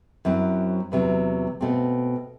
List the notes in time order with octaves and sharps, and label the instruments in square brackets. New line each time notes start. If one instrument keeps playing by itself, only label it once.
[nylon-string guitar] F#2 F#3 C4 E4
E2 C3 F#3
B2 A3 C4